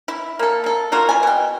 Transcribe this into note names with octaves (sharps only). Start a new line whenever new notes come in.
E4
A#3 A4
A#3 A4
A#3 F4 F#4 A#4
E4 G#5
B2 G5